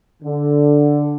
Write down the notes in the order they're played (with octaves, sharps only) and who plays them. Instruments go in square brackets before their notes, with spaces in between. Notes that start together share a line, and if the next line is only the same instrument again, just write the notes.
[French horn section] D3